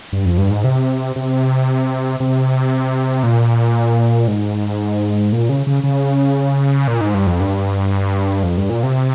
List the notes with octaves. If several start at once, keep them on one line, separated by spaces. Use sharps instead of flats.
G2
F2
G2
G#2
C3
C3
C3
A#2
G#2
A#2
C#3
C#3
C#3
A#2
G#2
G2
F2
G2
F2
G2
A#2
C3